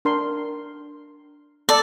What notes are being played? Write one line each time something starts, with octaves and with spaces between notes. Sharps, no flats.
D4 A#4 C6
A4 D5